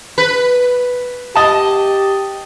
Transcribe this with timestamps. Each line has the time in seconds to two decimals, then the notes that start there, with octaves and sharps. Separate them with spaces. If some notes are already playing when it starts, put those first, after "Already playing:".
0.18 B4
1.35 G4 D#5 A5